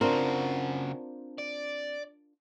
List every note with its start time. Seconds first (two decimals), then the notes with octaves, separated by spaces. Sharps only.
0.01 C#3 C4 D4 F4 F#4 A#4
1.39 D5